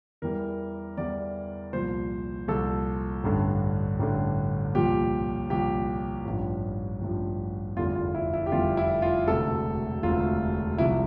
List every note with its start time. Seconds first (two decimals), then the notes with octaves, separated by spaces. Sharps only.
0.22 E2 E3 G3 A#4
0.97 E2 E3 G3 D5
1.73 C2 A#2 F3 C5
2.48 C2 A#2 F3 A4
3.24 A1 G2 D3
3.99 A1 G2 D3
4.74 C2 A#2 F3 G4
5.50 C2 A#2 F3 G4
6.25 A1 G2 F3
7.01 A1 G2 F3
7.77 F1 E2 D3 G3 F4
7.96 F4
8.15 E4
8.34 E4
8.46 G4
8.52 F1 E2 D3 G3 F4
8.77 E4
9.02 F4
9.27 E1 D2 C3 A4
10.03 E1 D2 C3 F4
10.78 C2 C3 F3 E4